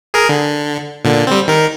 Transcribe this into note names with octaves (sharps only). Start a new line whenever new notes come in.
G#4 A#4
D3
A#2 D3
G3 C4
D#3 A#4